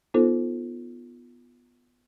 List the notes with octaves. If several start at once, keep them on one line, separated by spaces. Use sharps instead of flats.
B3 D#4 F4 A4 C5